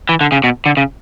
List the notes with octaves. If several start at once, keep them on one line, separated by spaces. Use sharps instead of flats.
E3
D3
C#3
B2
D3
C#3